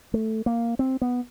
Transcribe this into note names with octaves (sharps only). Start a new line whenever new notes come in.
A3
A#3
C4
B3